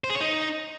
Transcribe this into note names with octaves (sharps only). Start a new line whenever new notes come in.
C5
G#4
C#5
D#4